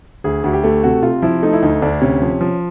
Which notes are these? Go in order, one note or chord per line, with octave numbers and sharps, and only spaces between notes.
D2 G#4
D2 F#4
G4
A3
C3 F#4
C3 F4
F3 E4
A3 D#4
E4
D2 D#4
D2 D4
C3 C#4
F3
F3